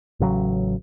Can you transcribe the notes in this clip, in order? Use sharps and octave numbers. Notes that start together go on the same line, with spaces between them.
A1 C#3 F3 F#3